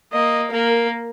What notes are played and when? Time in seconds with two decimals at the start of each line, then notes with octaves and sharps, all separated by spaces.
0.12 A#3 D#5
0.52 A#3 A#4